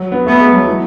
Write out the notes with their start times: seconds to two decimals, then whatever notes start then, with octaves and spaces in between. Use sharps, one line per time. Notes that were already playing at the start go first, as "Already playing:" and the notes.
Already playing: F#3
0.12 B3
0.26 A3 B3
0.40 G#3
0.53 F#3
0.67 E3